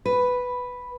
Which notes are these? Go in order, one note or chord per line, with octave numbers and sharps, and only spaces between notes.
B4